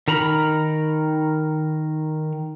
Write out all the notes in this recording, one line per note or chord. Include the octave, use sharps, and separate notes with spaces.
D#3 A#4 A#5 B5